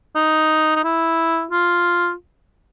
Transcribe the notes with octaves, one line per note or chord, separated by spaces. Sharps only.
D#4
D#4
E4
F4